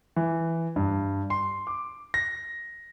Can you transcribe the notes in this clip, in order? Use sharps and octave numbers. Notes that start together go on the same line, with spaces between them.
E3
G2
C6
D6
A#6